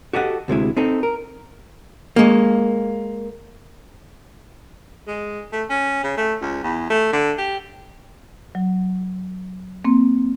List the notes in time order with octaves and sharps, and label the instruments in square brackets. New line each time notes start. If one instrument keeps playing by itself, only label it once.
[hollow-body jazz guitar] F#4 G4 A4 D#5 F#5
D2 C3 G#3 E4
C4 D#4 A4
A#4
G#3 A#3
[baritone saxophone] G#3
A3
C#4
C#3
A3
C#2
E2
A3
D3
G4
[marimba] F#3
A#3 C4